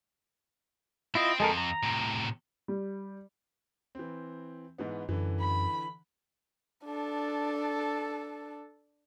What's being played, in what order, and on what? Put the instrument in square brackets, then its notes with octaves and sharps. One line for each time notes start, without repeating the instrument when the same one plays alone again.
[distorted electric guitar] C4 [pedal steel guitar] E4 F4 D#5
[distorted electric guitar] F2 [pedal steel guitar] G#3 A4 A#4
[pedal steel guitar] A#5
[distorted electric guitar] A2 C3
[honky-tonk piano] G3
[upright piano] E3 C4
G#2 E3 B3
[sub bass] F#2 [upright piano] D3 E3
[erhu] B5
[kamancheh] D4 A4